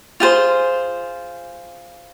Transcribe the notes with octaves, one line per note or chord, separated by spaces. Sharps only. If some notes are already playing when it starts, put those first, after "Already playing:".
F4 G#4 C5